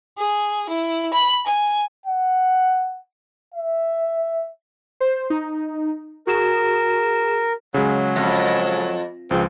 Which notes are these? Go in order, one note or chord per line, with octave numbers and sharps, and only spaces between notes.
G#4
E4
B5
G#5
F#5
E5
C5
D#4
F#4 G#4 A#4 E7
C#3 F#3 G#3
F2
C#2 F3 G#3 C4